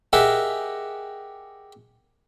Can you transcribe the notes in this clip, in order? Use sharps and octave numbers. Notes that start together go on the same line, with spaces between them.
G4 G#4 A#4 D#5 E5 F#5